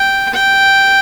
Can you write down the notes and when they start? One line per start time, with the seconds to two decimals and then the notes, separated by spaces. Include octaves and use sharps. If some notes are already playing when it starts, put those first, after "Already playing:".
Already playing: G5
0.34 G5